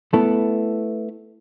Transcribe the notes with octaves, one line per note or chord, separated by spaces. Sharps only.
A3 B3 E4 A4